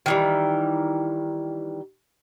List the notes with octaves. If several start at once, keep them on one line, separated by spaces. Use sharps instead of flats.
D#3 E3 G3